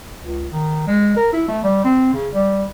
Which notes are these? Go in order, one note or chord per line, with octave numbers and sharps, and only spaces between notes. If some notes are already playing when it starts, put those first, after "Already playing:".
C#2
D#3
G#3
A#4
E4
A3
G3
C4
C#3
G3